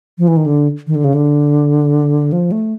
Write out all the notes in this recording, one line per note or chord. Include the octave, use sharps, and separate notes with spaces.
F3
E3
D#3
D3
D#3
D3
C#3
D3
F3
A3